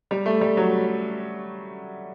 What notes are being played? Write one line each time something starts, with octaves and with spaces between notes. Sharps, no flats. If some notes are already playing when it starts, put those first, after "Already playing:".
G3
A3
G3
F#3